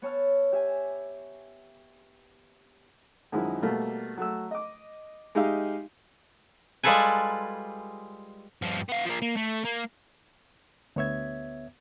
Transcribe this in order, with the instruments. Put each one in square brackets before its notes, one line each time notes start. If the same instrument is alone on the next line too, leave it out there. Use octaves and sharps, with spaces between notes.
[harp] B3 C#5 A5 E6 F6
G4 E5 G#5
[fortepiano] F#2 D#3 F3 G#3 E4
B2 G3 A3 A#3
F#3 A3 E6
D#5 D6
G#3 D#4 G4 E5 F5
[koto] G3 G#3 F4 A4 B4 G#5
[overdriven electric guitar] G2 F3
B3 F5
F3 A#3
A#3
A3
A#3
[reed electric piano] D2 B3 C#5 E5 G#6